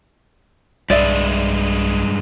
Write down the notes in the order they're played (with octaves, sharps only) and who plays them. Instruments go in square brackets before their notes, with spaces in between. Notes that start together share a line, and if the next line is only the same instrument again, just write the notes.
[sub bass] B1 [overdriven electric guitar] G2 G#3 [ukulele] D5 E5